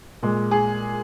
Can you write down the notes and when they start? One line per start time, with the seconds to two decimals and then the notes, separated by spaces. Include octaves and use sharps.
0.23 A#2 G#3
0.51 G#4